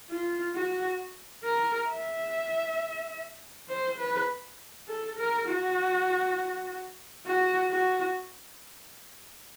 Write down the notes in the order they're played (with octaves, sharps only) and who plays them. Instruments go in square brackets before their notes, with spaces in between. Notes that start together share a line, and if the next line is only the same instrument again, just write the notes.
[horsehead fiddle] F4
F#4
A#4
E5
C5
B4
A4
A#4
F#4
F#4
F#4